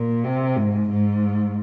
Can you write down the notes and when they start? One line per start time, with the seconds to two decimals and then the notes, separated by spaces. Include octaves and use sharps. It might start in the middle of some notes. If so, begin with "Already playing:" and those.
Already playing: A#2
0.24 C3
0.57 G#2
0.90 G#2